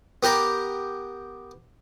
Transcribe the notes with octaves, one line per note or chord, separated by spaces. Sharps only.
B3 G4 A#4